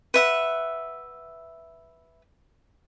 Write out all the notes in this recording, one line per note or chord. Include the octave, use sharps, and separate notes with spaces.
B4 E5 F#5